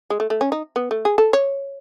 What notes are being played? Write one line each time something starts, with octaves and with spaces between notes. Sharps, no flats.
G#3
A3
A3
C#4
D#4
B3
A3
G#4
A4
C#5